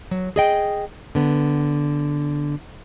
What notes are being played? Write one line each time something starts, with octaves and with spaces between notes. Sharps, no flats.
F#3
G#4 D#5 G5
D3 B3